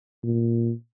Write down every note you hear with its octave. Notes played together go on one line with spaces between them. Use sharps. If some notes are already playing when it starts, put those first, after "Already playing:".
A#2